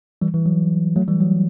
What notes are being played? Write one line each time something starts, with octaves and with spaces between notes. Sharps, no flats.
E3 G3
E3
F#3
F#3 A3
E3 G3
F#3